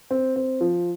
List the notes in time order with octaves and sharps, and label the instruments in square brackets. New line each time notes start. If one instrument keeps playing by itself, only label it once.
[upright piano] C4
C4
F3